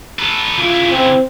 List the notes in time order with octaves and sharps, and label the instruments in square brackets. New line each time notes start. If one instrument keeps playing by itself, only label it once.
[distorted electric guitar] A4 B4
[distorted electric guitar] C#3 E4 [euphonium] F4
[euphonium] C4